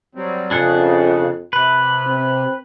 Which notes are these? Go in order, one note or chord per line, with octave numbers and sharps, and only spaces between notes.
F#3 G3 C4
F2 C#3 D4 G#4 F#5
C3 B4
C4